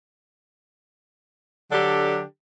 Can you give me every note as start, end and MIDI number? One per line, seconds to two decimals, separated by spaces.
1.71 2.21 50
1.71 2.21 54
1.71 2.21 62
1.71 2.21 67
1.71 2.21 69